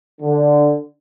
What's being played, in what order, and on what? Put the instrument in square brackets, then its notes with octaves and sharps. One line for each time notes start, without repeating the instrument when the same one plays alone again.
[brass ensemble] D3